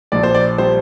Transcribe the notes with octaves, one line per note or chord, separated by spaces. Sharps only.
A#1 D5
C5
D5
G3 C5